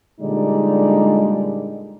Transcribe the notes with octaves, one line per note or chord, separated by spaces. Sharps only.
A#2 D3 G3 G#3 D#4 D5